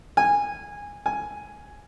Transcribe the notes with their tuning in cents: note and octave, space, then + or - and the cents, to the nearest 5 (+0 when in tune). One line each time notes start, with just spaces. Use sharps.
G#5 -15
G#5 +5